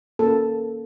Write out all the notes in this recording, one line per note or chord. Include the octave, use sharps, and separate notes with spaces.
A#3 C#4 F4 A4